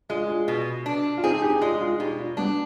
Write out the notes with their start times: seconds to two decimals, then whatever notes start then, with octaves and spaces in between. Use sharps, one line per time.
0.09 G#3 D4 F4
0.28 D4 F4
0.48 B2
0.86 D4
1.18 F4
1.24 C4 D#4 G#4
1.42 D#4 G4
1.61 G#3 D4 F4
1.81 D4 F4
1.99 B2 D#4 G4
2.18 D4 F4
2.37 G3 B3 D4